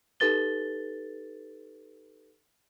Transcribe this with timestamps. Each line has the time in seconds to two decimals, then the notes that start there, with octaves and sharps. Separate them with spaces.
0.20 D#4 G4 A4 B4 A6 G7